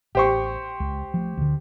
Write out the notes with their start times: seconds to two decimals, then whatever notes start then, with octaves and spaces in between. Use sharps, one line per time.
0.15 A1 G4 C5 C#6
0.80 C#2
1.14 F3 A3
1.37 D2 D3